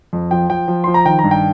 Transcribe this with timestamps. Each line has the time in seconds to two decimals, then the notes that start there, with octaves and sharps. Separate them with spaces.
0.13 F2
0.31 F3 G5
0.49 F3 G5
0.68 F3
0.84 F3 C6
0.94 A#5
1.06 D#3 G5
1.19 A#5
1.24 G2
1.31 G5